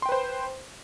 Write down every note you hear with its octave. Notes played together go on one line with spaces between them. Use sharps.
B4 C5 G5 C6